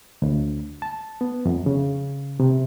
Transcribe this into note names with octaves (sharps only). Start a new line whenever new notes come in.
D2
A5
B3
F2
C#3
C3